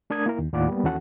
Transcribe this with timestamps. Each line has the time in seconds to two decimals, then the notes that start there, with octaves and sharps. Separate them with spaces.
0.10 A3 D4 A#4 D#6 G#6
0.26 A#3 E4 A#4
0.39 D#2
0.53 D#2 A2 F4 D5 F#5 D6
0.68 G3 A#3 B3
0.84 D#2 E3 C#4 F#4 A4 F#5